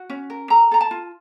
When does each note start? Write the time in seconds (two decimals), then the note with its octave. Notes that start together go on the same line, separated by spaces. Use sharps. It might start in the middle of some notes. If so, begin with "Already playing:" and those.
Already playing: F#4
0.10 C#4
0.30 A#4
0.50 A4 A#5
0.71 A4 A#5
0.81 A5
0.91 F4